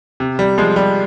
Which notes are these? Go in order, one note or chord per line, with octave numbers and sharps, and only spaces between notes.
C3
G3
F3 G#3
G3